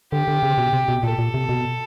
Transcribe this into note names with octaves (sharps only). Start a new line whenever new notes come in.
D3 G4
D3
C#3
B2
C3
B2
A#2 A4
A#2
C3
B2